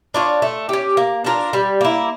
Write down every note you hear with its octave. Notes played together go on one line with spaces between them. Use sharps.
D4 F4 C#5
A3
C#4 G4
A#3
D4 F4 A#4
G3
A#3 E4